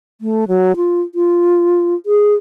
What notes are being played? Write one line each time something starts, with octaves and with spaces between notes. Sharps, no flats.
A3
F#3
F4
F4
G#4